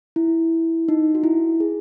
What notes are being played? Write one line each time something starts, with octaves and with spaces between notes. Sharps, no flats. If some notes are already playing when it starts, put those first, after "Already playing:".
E4
D#4
F#4
E4
G#4